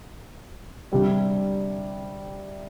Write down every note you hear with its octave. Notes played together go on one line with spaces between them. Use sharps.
C3 G3 D4